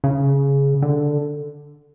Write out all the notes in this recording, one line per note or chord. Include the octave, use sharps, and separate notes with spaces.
C#3
D3